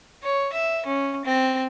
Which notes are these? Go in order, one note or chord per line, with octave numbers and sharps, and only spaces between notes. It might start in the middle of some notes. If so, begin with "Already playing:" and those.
C#5
E5
C#4
C4